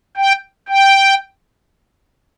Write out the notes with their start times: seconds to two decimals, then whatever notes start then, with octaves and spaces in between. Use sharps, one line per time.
0.17 G5
0.68 G5